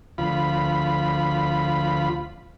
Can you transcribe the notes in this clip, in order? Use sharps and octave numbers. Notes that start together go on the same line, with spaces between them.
D2 F3 F4 B5